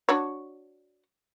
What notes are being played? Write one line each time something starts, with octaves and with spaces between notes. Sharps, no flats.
D4 F#4 C#5